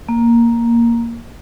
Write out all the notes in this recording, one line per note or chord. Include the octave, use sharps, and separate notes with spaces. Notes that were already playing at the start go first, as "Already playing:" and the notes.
A#3